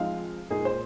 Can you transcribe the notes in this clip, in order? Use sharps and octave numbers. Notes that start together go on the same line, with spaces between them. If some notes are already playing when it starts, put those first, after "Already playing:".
Already playing: F3 G#3 C4 D#4 F5
A#2 G#3 D#4 G#4
C5